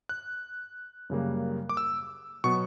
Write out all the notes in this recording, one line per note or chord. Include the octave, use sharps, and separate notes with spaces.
F#6
F#2 C#3 G3 A#3
D6
E6
B2 F#3 B3 C#6